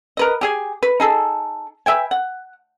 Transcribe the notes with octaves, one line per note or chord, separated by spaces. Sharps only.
A#4 B4 D#5
G4 G#4 G#5
B4
D#4 G#4 A4
B4 E5 G5 G#5
F#5